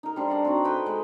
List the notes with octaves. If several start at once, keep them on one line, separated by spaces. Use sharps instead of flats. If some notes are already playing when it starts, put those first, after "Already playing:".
D#4 A#4
G3 D4 C5
D4 A#4 F#5
C4 D#4 F#4
A4 B4 G5 A5
G#3